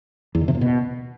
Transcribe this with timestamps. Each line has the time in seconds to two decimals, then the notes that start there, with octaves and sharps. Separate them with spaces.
0.35 E2
0.41 D#3
0.48 C3
0.55 A#2
0.61 B2